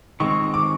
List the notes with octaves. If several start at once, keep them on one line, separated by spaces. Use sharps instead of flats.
D#3 G#3 C4 C#6
D6